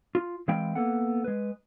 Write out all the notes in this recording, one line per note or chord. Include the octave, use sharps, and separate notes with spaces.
F4
E3 G#3 C4 F5 G5 B5
A#3 B3 A4 F#5
G#3 B4